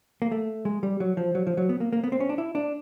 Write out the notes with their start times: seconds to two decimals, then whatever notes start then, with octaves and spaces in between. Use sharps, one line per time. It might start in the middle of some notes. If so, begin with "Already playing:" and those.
0.22 A#3
0.32 A3
0.65 G#3
0.83 G3
1.00 F#3
1.17 F3
1.35 F#3
1.47 F3
1.57 F#3
1.69 B3
1.80 A#3
1.93 A#3
2.04 B3
2.12 C4
2.20 C#4
2.29 D4
2.38 E4
2.55 D4